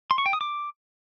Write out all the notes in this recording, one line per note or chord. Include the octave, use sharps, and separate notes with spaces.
C6
C#6
G5
D#6
D6